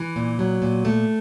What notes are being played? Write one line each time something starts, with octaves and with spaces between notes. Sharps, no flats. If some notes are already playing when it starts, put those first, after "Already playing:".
Already playing: E3
A#2
F#3
A#2
A3